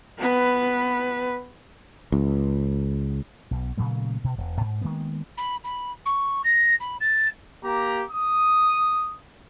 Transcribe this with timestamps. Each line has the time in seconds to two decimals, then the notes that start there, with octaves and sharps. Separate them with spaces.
0.19 B3 B4
2.12 C#2
3.51 B1 B2
3.78 A#2 C#3 F#3 A3
4.24 B2
4.38 E1
4.61 G#2
4.81 D#3 G#3 A#3 B3
5.37 B5
5.64 B5
6.05 C#6
6.44 A#6
6.80 B5
7.00 A6
7.63 A#3 G4 A#5
8.10 D#6